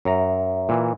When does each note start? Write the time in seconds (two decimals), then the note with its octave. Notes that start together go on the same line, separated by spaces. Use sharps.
0.05 F#2 E5 A#5
0.69 A#2 E3